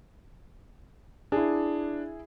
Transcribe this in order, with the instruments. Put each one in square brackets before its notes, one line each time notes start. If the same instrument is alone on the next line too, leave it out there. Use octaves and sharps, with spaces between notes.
[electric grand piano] D4 [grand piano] E4 G#4